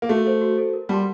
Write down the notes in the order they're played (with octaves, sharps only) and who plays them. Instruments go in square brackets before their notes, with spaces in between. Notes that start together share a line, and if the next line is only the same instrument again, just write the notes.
[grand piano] A#3
[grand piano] A3 [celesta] F#4
[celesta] A4 C5
F#4
A4 C5
A#4
[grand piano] G3 [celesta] F#5 A5 C6